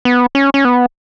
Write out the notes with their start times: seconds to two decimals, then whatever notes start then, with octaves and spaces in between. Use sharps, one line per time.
0.05 B3
0.35 C#4
0.54 C#4
0.65 B3